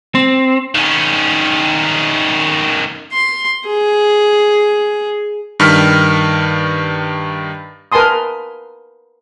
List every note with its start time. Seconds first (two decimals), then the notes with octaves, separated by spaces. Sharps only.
0.15 C4
0.75 D#3 C#4
3.12 C6
3.67 G#4
5.60 G2 D#3 F6 B6
7.92 A#4 B4 G#5 A5 C6 D#6